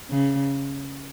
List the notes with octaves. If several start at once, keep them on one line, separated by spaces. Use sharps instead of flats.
C#3